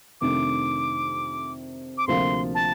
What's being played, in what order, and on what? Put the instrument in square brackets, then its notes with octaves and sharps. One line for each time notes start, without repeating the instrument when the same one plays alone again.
[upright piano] F2 C3 D#3 A3 D4 [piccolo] D6
[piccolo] D6
[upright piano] D2 C3 F3 A#3 F4 [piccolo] C6
[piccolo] A5